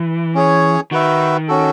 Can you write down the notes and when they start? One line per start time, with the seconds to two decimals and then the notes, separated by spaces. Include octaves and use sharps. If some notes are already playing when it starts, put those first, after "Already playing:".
Already playing: E3
0.35 C#4 G#4 C#5
0.91 D#3 F#4 B4 E5
1.48 C#4 F#4 A4